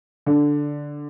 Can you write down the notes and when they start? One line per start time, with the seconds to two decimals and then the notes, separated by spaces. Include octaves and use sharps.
0.26 D3